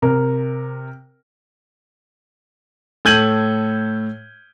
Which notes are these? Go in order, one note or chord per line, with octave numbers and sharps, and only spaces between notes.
C3 A#4
A2 A4 G6 G#6 D#7 F#7